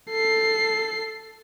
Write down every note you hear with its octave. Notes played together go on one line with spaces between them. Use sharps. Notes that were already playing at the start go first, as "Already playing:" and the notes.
A4 C7